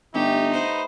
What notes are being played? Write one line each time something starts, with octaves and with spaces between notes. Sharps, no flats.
G1 A3 D#4 G4
B4 C5 D#5 F#5